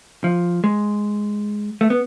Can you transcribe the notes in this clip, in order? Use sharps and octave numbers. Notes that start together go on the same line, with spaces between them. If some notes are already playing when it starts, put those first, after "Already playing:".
F3
G#3
A3
B3